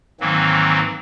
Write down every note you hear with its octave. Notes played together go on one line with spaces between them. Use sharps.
G#2 D#3 E3 F#3 A#3 C4